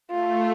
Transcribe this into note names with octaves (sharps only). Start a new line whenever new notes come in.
A3 F4